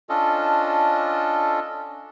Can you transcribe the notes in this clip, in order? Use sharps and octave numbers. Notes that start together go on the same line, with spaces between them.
C#4 D4 F4 A4 D#5